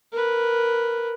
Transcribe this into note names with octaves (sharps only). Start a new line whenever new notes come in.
A#4 B4